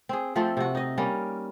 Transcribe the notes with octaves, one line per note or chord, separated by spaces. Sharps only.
C4 G#4
F3 A3 C4 A4
C3 F#4
D#4 D#5
G3 A#3 C#4